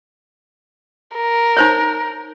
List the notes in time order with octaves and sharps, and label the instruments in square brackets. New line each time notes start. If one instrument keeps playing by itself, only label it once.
[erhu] A#4
[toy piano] D#4 C5 C#5